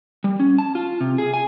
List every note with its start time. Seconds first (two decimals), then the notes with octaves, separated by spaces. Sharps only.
0.24 G3
0.40 C#4
0.58 A5
0.75 F4
1.01 C3
1.18 G#4
1.34 G#5